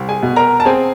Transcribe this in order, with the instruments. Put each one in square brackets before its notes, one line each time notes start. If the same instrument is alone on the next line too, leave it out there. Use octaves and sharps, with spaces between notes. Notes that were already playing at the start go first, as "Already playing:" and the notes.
Already playing: [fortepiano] C2
[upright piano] G#4 G#5
[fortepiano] B2
[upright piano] A#4 A#5
A5
[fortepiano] C4 [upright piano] G#4 G#5